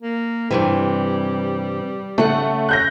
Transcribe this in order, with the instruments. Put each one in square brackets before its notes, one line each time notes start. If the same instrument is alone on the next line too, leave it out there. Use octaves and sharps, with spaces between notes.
[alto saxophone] A#3
[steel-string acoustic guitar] G2 C3 E3 [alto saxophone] G3
[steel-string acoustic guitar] C#3 F#5 [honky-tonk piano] A3
[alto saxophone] C#4 [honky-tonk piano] F#6 G6 A#6